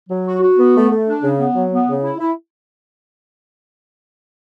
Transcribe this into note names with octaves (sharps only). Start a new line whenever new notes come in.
F#3
F#4
F#4
B3
A3
A3
D4
C#3
B3
F#3
B3
C#3
E4
E4